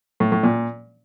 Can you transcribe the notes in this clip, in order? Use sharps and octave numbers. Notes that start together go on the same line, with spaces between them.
A2
A2
A#2